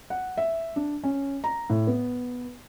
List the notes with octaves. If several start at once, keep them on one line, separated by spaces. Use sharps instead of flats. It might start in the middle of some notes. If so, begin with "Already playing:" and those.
F#5
E5
D4
C#4
A#5
A2
B3